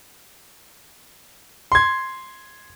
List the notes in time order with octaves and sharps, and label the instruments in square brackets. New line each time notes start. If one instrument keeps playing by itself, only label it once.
[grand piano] C6 G#6